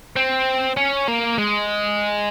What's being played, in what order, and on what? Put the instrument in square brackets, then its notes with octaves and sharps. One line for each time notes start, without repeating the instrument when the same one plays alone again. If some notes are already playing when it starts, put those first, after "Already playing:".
[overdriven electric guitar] C4
C#4
A#3
G#3